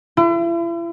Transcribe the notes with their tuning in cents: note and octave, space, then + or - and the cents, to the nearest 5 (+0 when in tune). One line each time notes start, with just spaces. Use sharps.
E4 +40